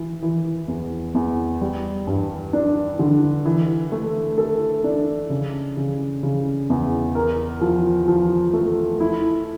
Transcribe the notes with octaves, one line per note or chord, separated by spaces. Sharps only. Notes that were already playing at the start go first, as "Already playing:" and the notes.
Already playing: E3
E3
E2
E2
G3
G2
D4
D3
E3
A3
A4
D4
C#3
C#3
C#3
E2
A#4
F3
F3
A3
E4